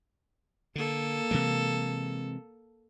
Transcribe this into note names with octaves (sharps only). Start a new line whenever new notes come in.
D3 A#3 A4
C3 E3 G#3